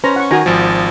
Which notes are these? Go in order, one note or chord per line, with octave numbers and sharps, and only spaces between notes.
C#4 B4 C5 A#5
F#5 C#6
D#3 F#4 G#5 A#5
G#1 F3